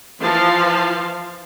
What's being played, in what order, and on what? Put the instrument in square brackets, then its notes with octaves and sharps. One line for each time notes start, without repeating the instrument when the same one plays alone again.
[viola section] E3 F3 F4 F5 A5 C6